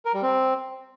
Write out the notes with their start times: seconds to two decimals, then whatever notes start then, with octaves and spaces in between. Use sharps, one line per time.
0.05 A#4
0.14 G3
0.23 C4